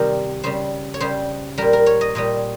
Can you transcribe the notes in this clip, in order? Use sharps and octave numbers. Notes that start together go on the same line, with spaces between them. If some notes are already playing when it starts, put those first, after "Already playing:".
Already playing: C3 D#3 G3 A#4
C#3 G3 C5
C#5
C#3 G3 C5
A#2 G3 A#4
A#4
C#5
D#5
A#2 G3 D#5